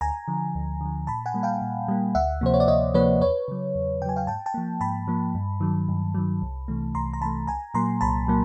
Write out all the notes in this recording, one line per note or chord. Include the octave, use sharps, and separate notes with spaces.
D2 G#5 A#5
D3 F3
D2
D3 F3
A#2 A5 B5
F#5 G#5
G3 A#3
F5 G5
A#2
G3 A#3
D2 E5 F#5
C3 F3 A#3 C5
C#5
D5
D2 C#5 D#5
C3 F3 A#3 B4 C#5
E2 B4 C#5
C#3 F#3
E2
C#3 F#3 G5 G#5
F5 G5
G#2 G5 A5
G5 A5
F3 A#3
G#2 A5 B5
F3 A#3
G2
D#3 F#3
G2
D#3 F#3
C2
C3 E3 A3
C2 A#5 C6
A#5
C3 E3 A3 A5 B5
C2 G#5 A#5
A#2 F#3 A#3 A#5 C6
C2 A5 B5
A#2 F#3 A#3